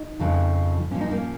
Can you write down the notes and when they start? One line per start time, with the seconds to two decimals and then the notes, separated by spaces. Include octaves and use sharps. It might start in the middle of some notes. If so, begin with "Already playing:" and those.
Already playing: D#4
0.19 F2 C#3 F3
0.91 A#2 F3 C#4
1.01 D#4
1.11 A#3 C#4